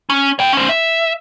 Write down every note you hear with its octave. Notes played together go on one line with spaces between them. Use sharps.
C#4
C#5 G5
C#4 C5
E5